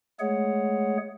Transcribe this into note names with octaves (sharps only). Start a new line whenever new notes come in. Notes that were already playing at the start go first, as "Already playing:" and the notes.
G#3 A3 G#4 C#5 F#5